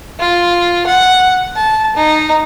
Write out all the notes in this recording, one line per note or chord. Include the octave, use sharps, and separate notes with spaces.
F4
F#5
A5
D#4